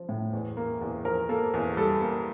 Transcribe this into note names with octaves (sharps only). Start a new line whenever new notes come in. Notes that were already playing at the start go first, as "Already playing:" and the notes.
Already playing: F3
A2
E2
A#3
E2
F3 A#4
A#3 A4
E2
G3 A4
A#3